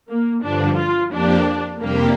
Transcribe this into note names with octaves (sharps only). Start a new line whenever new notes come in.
A#3
G2 D3 F3 D4
F4
F2 F3 A#3 D4 G4
F2 C3 G3 A#3 D4 G4